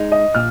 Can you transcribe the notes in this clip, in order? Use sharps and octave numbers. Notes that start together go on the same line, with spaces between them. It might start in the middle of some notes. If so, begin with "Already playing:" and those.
Already playing: G#3 D#4 G#4
D#5
A#2 F6